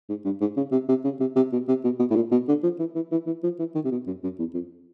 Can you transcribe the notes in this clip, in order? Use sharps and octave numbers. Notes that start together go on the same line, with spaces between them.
G#2
G2
G#2
C#3
C3
C3
C#3
C3
C3
B2
C3
B2
B2
A2
A#2
B2
D3
F3
E3
E3
E3
E3
F3
E3
D#3
C3
B2
F#2
F#2
E2
F2